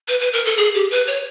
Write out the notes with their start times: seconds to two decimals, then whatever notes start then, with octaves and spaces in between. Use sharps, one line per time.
0.08 B4
0.20 B4
0.33 A#4
0.45 A4
0.57 G#4
0.74 G4
0.91 B4
1.07 C#5